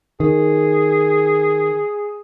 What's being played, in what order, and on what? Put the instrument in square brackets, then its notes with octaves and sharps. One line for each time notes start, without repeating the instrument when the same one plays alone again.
[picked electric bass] D#3 [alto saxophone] G#4